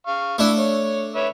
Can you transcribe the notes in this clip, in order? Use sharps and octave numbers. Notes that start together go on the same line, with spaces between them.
F5 C#6
A3 D4 E4 E5
C#5
B4 C#5 E5